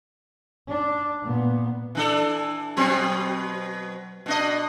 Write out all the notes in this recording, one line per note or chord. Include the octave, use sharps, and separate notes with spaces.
D4
A#2 B3
E3 D4 A4
B2 F#3 C4
B2 D4 D#5